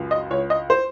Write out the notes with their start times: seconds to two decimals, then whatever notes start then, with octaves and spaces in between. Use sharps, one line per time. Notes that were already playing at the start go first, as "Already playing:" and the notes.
Already playing: C#2 F#2
0.11 D#5
0.30 C#2 C#5
0.50 D#5
0.70 C5